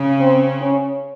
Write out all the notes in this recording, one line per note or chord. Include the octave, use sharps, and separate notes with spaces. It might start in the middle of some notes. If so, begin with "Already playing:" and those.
Already playing: C#3
C4
C#4